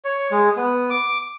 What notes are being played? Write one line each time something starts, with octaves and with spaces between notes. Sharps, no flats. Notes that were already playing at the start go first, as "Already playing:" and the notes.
C#5
G#3
B3
D6